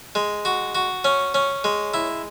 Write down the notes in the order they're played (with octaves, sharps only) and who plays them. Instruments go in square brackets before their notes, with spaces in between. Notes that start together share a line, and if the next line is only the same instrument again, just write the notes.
[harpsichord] G#3
F#4
F#4
C#4
C#4
G#3
E4